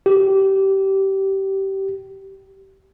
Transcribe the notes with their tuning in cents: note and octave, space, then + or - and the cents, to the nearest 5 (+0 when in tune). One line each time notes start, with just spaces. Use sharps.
G4 -20